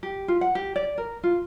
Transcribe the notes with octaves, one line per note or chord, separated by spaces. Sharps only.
G4
F4
F#5
G4
D5
A#4
F4